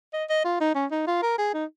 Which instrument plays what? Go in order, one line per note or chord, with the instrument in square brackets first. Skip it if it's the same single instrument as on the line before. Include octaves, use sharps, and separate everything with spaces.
[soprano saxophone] D#5
D#5
F4
D#4
C#4
D#4
F4
A#4
G#4
D#4